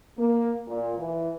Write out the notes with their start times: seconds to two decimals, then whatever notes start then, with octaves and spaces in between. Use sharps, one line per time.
0.18 A#3
0.67 A#2
0.98 E3